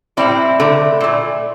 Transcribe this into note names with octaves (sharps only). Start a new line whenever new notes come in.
A2 G3 C4 E4
D3 A3
A#2 A3